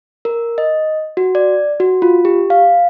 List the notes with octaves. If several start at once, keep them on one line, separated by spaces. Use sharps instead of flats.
A#4
D#5
F#4
D5
F#4
F4
G4
F5